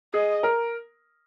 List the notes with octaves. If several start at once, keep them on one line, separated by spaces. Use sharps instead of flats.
G#4 D#5
A#4